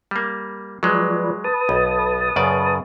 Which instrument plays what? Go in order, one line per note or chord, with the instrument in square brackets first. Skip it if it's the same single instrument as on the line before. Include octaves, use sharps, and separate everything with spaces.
[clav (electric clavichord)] G3 A#3
[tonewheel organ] F3 B4 D5 [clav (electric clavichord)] F#3 G#3
[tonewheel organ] B4 A5 D#6
[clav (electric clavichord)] B1
F#2 C#3 D5